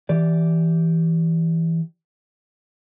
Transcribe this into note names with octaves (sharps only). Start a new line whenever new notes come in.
E3 G4 D5